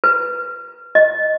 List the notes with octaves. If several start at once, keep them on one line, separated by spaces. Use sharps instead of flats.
B4
D#5